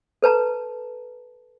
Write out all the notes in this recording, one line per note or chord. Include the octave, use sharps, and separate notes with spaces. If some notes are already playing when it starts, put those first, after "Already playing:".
A4 B4 A5 A#5